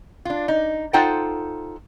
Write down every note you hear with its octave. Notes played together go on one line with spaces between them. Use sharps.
D4 F4
D#4
D#4 F4 A4 C5 F#5 G5